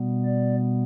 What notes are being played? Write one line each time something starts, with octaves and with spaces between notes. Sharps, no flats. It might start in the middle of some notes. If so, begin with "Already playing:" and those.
Already playing: B2 G3 B3
D5